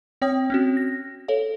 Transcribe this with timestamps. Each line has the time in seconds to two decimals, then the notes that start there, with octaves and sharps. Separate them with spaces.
0.22 C4 C#5 G5 D#6
0.50 C4 C#4 F#4
0.77 A#6
1.28 A4 C#5 F5